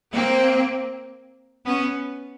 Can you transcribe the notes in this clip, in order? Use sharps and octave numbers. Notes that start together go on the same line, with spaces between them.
A#3 C4
B3 C#4